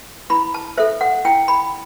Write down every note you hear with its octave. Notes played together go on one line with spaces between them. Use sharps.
E4 B5
A5
A4 C5 E5
F#5
E4 G5
B5